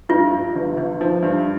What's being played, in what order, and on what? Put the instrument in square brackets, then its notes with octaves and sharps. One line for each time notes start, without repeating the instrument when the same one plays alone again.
[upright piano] G2 [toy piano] F4
[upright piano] G2
G1
G1
F3
G2